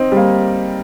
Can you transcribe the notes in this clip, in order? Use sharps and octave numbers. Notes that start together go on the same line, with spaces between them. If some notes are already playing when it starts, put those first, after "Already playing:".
Already playing: C4 D#4
G3
A#3